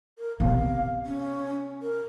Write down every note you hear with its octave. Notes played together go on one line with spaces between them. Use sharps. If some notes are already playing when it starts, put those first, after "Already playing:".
A#4
C3 B3 F5
C#4
A#4